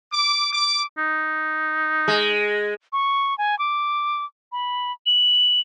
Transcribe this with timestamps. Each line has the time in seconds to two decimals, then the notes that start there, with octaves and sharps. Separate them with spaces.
0.12 D6
0.52 D6
0.98 D#4
2.08 G#3
2.93 C#6
3.38 G#5
3.59 D6
4.52 B5
5.06 F#7